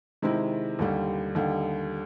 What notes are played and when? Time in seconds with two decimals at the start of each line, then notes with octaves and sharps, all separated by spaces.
0.22 C3 D#3 G#3 C4 E4
0.79 D#2 D3 G3
1.35 D#2 D3 G3